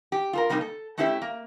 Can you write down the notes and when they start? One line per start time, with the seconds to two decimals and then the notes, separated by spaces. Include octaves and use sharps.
0.12 G4
0.33 F4 A4 A#4
0.49 C3 G3 A#3 D#4
0.61 A4
0.98 A3 C#4 E4 G4 C#5 E5
1.22 A#3